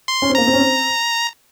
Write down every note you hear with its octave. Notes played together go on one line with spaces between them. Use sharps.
C6
C#4
C4
A#3 A#5
C4
C#4
C4